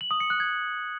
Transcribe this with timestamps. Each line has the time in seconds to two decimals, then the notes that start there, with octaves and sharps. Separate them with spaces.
0.01 F#7
0.11 D#6
0.20 C#7
0.30 F#6
0.40 G#6